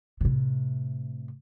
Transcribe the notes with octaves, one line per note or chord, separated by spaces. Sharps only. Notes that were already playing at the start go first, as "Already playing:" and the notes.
A2 C3